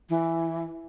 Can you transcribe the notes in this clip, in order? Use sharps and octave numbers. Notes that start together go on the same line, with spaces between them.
E3